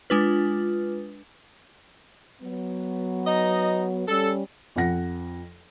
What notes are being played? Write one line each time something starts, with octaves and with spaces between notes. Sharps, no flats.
G#3 D4 F4 B4
F#3 B3
D#4 D#5
G3 C#4 A4
F2 F3 F#5 A#6